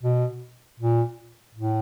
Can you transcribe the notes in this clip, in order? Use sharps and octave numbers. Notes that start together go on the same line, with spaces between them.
B2
A#2
A2